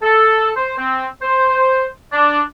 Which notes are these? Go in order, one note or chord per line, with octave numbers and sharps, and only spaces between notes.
A4
C5
C4
C5
D4